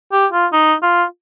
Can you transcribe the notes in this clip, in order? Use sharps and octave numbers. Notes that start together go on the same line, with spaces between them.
G4
F4
D#4
F4